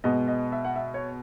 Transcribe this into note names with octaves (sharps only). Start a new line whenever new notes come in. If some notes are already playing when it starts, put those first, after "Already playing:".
B2 G#3 B3 D#5
D#5
E5
F#5
E5
C#5